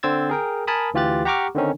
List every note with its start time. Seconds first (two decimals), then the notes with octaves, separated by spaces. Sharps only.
0.03 D3 C4 C5 E6 G#6 A6
0.30 G#4 A#4 G5
0.67 A#4 G#5 A5 B5 D#6
0.94 D2 E3 F4 G4 F#6 A6
1.25 G4 F#5 A#5 C#6 D6 F6
1.55 D3 D#3 C4 C#4 D#4